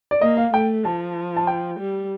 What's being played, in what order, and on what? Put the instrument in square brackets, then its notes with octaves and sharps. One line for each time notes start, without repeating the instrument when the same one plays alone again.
[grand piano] D5
[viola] A#3 [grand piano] D#5
[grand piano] F5
[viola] A3 [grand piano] G5
[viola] F3 [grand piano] A5
[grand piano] A5
G5
[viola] G3